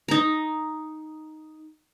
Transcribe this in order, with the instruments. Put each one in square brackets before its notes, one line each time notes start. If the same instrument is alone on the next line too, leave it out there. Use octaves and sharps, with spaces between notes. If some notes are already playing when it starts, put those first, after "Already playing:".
[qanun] D#4 A#5